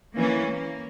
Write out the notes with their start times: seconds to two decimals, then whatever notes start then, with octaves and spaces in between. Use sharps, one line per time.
0.15 E3 A#3 C#4
0.48 A#3